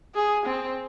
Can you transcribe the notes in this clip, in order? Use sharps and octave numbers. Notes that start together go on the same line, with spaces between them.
G#4
C4